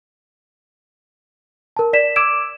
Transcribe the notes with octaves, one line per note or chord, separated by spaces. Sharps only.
A#4 A5
D5 B6 E7
D6 E6 G#6 D7 E7